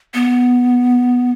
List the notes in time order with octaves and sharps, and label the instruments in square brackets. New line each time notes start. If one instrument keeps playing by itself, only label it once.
[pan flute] B3